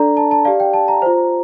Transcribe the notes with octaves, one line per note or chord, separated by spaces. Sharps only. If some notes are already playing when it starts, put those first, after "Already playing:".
Already playing: D4 A4 D5 A#5
A5
A5
G4 D5 F5
G5
A5
A#5
F4 C5